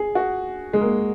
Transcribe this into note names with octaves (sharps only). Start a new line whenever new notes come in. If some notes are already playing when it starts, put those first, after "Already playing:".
Already playing: G#4
F#4
G#3
A#3